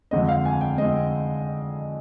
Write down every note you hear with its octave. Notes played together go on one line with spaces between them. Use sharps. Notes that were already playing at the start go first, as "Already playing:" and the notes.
F2 D3 G#3 C4 D#5
F5
G#5
G5
F2 D3 G#3 C4 D#5